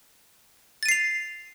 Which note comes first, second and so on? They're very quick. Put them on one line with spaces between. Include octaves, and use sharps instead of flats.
A6 D#7 C7 F7